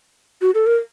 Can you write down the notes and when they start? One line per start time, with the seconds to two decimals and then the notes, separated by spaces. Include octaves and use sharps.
0.42 F#4
0.55 A4
0.67 A#4